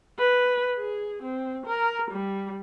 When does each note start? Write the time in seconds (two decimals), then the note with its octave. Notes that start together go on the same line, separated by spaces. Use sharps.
0.19 B4
0.77 G#4
1.23 C4
1.66 A#4
2.11 G3